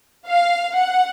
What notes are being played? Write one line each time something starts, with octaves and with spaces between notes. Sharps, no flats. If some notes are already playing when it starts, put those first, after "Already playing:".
F5
F#5